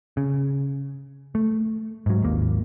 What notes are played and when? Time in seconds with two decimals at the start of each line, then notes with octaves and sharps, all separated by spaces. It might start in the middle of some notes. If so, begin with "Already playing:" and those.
0.17 C#3
1.35 A3
2.06 G#2 F#3
2.22 G#1 D#2 A#3